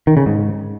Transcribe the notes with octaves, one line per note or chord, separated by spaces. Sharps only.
D#3
C#3
G#2